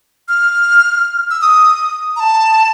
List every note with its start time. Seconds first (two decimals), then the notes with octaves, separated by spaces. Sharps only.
0.29 F6
1.31 E6
1.41 D#6
2.16 A#5
2.20 A5